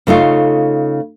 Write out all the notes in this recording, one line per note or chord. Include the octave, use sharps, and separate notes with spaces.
C#3 A3 D#4 F4